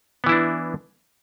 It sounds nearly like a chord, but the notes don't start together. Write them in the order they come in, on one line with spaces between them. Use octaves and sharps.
B3 E3 E4 D4